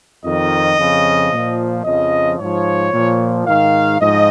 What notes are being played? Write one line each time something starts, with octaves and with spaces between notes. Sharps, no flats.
F2 D#3 D#5
F2 C#3 F3
A#2 F3
F2 C#3 F3 D#5
G#2 F3 C#5
A#2 F3
G#2 D#3 F5
G#2 F3 D#5